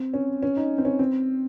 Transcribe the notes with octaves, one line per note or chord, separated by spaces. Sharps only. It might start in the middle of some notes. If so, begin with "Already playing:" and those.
Already playing: C4
C#4
C#4
D#4
C4
C#4
C4